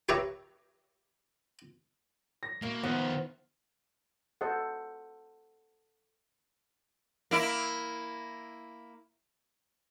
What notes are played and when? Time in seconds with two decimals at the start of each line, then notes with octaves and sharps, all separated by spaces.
0.09 G4 B4 C#5 E5 A#5
2.43 A#6
2.62 B2 A#3 E4
2.83 D#3 F3 B3 E5
4.41 A4 C5 D#5 F#5
7.31 A#3 E4